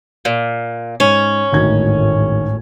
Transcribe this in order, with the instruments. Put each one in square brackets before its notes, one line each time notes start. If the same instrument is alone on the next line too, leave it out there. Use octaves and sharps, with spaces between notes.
[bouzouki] A#2
[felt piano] G#2 [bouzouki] C#4
[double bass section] G#1 A2 [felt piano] D2 D#3 G#6